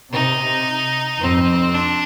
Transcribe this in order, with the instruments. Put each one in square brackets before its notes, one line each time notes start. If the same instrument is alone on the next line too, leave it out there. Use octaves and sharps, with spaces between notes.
[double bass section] C3 [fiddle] D#4
[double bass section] F2 [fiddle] C4
[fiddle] D4